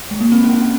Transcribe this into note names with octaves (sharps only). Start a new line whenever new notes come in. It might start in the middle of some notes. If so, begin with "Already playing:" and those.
G#3
A#3
C4
C#4
C#4